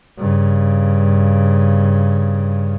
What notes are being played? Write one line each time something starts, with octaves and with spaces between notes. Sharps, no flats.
G2 C#3